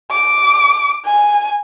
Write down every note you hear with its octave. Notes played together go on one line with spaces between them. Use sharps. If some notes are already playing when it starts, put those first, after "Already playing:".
D6
G#5